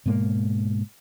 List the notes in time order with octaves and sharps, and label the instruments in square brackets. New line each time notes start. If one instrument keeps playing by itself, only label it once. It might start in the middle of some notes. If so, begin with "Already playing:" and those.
[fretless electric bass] G#2 B2 G#3 A#3